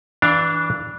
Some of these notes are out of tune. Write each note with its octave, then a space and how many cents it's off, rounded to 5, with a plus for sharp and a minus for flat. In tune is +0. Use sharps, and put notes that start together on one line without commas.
E3 -15 D4 +0 F5 +0